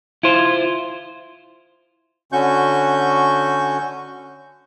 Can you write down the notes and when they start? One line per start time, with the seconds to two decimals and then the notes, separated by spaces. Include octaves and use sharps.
0.23 E4 F4 C5
2.32 D3 C#4 F#4 C#6 G6